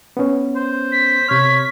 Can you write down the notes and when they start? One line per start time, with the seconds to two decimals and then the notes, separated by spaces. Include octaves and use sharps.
0.17 B3 C#4
0.56 C5
0.92 B6
1.29 C3 C#5 F6